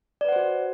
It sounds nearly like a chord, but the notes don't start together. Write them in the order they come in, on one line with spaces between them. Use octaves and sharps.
D5 B4 F#5 C5 F#4